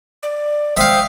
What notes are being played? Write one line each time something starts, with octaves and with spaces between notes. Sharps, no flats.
D5
C5 E5 F5 G5 D#6